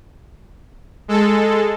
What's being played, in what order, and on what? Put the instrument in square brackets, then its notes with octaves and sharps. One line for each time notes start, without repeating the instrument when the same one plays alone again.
[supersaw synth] G#3 A4